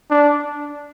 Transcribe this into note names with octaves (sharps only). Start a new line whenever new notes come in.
D4